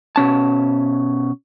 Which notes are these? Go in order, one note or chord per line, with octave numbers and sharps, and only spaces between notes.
B2 C#4 A5